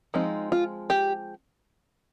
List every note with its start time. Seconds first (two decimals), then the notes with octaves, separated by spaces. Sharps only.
0.14 F3 G#3 C4 D#4
0.52 F4
0.90 G4